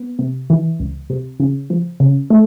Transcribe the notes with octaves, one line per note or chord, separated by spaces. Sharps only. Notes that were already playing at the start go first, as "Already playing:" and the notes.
Already playing: B3
C3
E3
C#2
C3
C#3
F3
C#3
A3